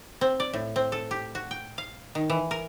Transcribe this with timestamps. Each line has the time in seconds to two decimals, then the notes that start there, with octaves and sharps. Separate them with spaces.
0.21 C4
0.40 D5
0.53 A2
0.76 C4
0.92 A4
1.11 G4
1.35 F#4
1.51 G5
1.78 F5
2.15 D#3
2.30 E3
2.51 A#4